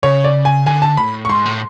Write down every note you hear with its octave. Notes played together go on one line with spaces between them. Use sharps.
C#3 C#5
D5
G#5
D3 G#5
A5
A2 B5
C#6
G#2 C6
A2